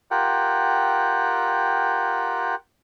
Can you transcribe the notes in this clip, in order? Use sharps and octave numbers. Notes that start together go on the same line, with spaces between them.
F4 G4 A#4 F#5 G5